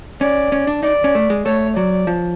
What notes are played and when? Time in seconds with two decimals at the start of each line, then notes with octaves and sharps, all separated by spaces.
0.21 C#4 D5
0.52 C#4
0.67 D4
0.83 D#4 D5
1.04 C#4
1.15 A3
1.30 G#3
1.45 A3 C#5
1.76 F#3 D5
2.07 F3